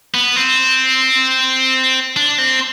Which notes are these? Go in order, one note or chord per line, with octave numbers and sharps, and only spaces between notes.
B3
C4
D4
C4